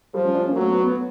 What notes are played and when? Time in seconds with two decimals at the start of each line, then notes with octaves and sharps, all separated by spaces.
0.14 F3 G3
0.25 C#4
0.34 D4
0.46 C#4
0.51 A#3
0.56 F#3 A3
0.70 B3
0.84 B3